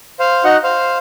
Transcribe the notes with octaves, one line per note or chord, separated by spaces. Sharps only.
C5 F5
D#4 F#4 D#5 F#5
C5 F5